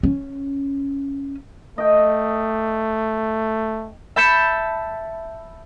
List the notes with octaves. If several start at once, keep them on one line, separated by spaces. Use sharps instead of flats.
C#4
A3 D#5 G5
E5 A5 B5 G6 C#7 E7